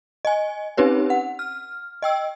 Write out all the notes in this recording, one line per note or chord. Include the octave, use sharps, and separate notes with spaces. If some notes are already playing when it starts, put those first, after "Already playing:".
D#5 G#5
C4 C#4 D#4 G4 B4 C#5
F#5
F6
D#5 G5 E6